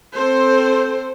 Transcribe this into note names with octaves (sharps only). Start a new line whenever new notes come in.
C4 A4 C5